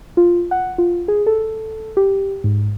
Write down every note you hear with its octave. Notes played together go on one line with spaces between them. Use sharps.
F4
F#5
F4
G#4
A4
G4
G#2